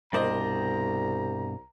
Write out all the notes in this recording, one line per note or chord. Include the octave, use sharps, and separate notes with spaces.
C2 G2 B2 A#3 C5 D5 D#5 A#5